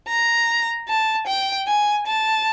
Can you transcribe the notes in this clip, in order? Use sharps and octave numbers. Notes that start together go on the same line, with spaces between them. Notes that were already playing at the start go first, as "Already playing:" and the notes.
A#5
A5
G5
G#5
A5